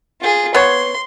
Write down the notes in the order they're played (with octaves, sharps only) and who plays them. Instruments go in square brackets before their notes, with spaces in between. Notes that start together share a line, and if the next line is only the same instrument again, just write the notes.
[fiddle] F4 G#4
[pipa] B3 C#5 [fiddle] C6